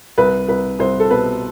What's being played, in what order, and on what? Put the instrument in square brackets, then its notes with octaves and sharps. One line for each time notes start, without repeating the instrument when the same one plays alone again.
[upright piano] C2 B4
C2 B4
C2 C5
A4
B2 B4